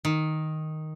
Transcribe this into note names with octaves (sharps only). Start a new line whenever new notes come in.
D#3